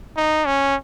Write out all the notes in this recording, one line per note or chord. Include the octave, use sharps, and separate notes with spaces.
D#4
C#4